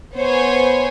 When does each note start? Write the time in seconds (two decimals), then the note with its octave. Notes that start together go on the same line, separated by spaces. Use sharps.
0.16 B3 C5 C#5 G#5